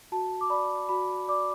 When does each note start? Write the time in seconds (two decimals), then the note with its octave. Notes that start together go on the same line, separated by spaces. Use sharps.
0.12 F#4 A5
0.41 D6
0.50 D5 B5
0.89 F#4 B5
1.28 D5 D6